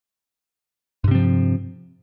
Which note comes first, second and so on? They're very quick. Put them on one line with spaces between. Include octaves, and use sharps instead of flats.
G2 C3 C4 F3